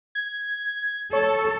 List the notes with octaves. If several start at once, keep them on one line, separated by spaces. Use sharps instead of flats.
G#6
A4 C#5